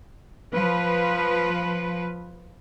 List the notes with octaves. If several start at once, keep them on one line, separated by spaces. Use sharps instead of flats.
F3 B4